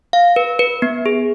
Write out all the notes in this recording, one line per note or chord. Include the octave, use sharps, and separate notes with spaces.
F5
B4
B4
B3
G#4